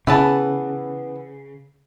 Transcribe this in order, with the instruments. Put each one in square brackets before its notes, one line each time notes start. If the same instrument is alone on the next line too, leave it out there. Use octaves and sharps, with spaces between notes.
[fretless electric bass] C#3 [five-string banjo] E3 B3 A5